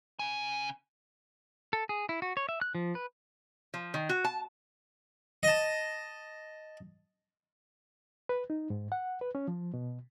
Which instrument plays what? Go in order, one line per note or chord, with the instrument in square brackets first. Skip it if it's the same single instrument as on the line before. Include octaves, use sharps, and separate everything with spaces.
[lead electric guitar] C#3 G#5
[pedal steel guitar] A4
G#4
E4
F#4
C#5
E5
F#6
F3
B4
[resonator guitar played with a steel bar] F3
D#3
F#4
A5
[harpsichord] D#5 A5
[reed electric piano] B4
D#4
G#2
F#5
B4
C#4
F3
B2